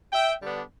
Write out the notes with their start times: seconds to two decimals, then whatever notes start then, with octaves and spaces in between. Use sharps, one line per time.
0.13 E5 G5
0.41 D3 G3 B3 D4